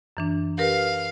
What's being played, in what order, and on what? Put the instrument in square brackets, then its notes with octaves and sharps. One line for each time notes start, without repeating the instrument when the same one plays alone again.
[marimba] F#2 E3 D4
[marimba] G4 A#4 B4 [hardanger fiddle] F5